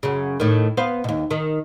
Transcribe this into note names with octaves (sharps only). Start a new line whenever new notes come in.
F#2 C#3
A2 D#3
B3 C5 F5
D#2 B2
D#3